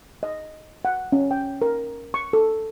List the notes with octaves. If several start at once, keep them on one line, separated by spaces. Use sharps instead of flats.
D#5
F#5
C#4
G5
A#4
C#6
A4